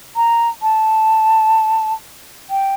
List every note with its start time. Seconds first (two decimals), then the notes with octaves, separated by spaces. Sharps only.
0.16 A#5
0.62 A5
2.50 G5